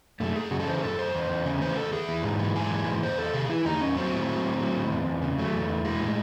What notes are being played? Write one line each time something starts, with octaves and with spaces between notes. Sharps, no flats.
F#2 A3
F#2 G#4
C#3 F#4
A4
E3 C5
G#4
F#2 A4
F#2 C5
E2
E2
C#3
E3 C5
E2 A4
E2 G#4
E3
G#2
E3
G#2 G#4
E3
G#2
E2 C5
E2 A4
C3 G#4
E3 E4
E2 D#4
E2 C#4
F#3 C4
A2
F#3
A2
F#3
A2
E2
E2
C#3
F#3 A3
E2
E2
E3 G#3
A2